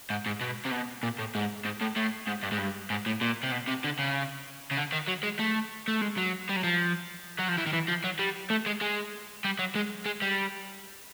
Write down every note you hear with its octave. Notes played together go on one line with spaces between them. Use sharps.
G#2
G#2
B2
C3
B2
A#2
A2
G#2
G#2
A2
A2
G#2
G2
G#2
G2
G#2
A2
A#2
C3
B2
C3
D3
C#3
C#3
D3
D#3
F#3
G#3
A3
A3
G#3
F#3
G3
F#3
F3
F#3
F3
E3
D#3
E3
F3
F#3
G3
A3
G#3
G#3
G3
F#3
G#3
G#3
G3